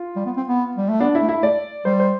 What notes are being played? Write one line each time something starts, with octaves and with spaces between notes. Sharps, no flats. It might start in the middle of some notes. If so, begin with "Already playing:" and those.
Already playing: F4
G3
B3
C4
B3
G3
A3
B3 D4
E4
A3
E4
A3 D5
G3 C5
C5